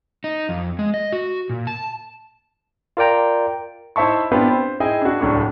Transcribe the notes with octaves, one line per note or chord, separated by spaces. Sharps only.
D#4
F2
G#3
D#5
F#4
A#2
A5
F4 A#4 D5 G5 A#5
D#4 E4 C5 E5 A5 C#6
B3 C4 D4 E4 F4 G4
C5
D#4 E4 G#4 D#5 G5 G#5
D4 F#4
D1 C2 A2 D4 C#6